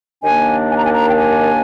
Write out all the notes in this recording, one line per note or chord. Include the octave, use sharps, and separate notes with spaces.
D#2 D#3 A#3 D4 G#5
G#5
A#5
G#5
A#5
G5
G#5